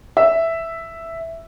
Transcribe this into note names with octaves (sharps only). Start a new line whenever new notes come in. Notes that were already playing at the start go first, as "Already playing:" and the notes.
E5